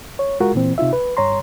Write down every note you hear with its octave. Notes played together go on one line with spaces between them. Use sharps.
C#5
G#3 F4 F#4 A#4
A#2 E3 C4
C3 D#4 F4 E5
B4
G2 C#5 A#5 C6